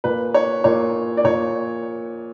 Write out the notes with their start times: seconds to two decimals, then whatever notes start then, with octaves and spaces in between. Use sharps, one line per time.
0.04 A#2 B4
0.34 C#5
0.64 A#2 C#5
1.17 D5
1.24 A#2 C#5